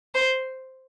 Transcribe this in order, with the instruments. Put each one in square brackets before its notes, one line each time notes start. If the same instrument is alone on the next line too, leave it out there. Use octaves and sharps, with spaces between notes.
[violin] C5